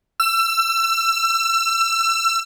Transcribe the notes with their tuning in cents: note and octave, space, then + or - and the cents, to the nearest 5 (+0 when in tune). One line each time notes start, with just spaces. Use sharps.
E6 +30